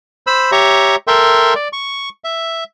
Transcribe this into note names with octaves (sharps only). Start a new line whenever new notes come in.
C5 B5 E6
G4 C#5 E5 A#5
A4 A#4 E5 G5 C6
D5
C#6
E5